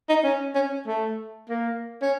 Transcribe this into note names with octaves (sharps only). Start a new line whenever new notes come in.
D#4
C#4
C#4
A3
A#3
C#4